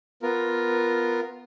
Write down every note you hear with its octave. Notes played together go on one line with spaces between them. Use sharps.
B3 F4 A#4